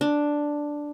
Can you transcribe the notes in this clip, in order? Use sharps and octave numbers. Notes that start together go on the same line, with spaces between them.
D4